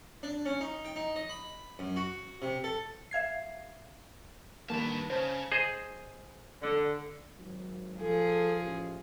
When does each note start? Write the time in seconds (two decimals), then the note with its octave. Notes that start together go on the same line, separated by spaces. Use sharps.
0.23 D4
0.46 C#4
0.61 D#4
0.85 G5
0.96 D#4
1.16 D#5
1.29 B5
1.79 F#2
1.96 F#4
2.42 C3
2.64 A4
3.11 E5 F5 G#6 C7
4.70 G2 D#3 A#3 B4 A5
5.10 C#3 C5 C#5 A5
5.52 G#4 C5 D#5
6.62 D3
7.38 G#1 F#3
8.00 F3 G#4 A4
8.62 A1